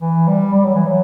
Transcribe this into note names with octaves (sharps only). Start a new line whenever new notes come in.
E3
G3
G3
F#3
E3
F#3